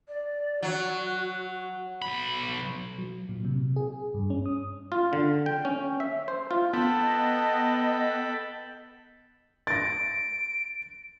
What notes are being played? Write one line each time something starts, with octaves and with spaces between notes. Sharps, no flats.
D5
F#3 F#4
B1 B5
F#3
A#2
C3
G#4
G2
C#4
D#6
F4
D3
G5
C#4
E5
C5
F4
B3 A4 G5 A5 B5
D#5
A6 A#6 D7